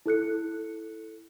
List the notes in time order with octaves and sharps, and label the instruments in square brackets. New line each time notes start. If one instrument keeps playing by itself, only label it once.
[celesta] E4 A4 F#6 C#7